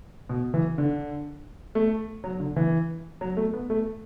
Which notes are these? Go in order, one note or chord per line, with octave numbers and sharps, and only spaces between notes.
B2
E3
D3
A3
F#3
D3
E3
F#3
A3
B3
A3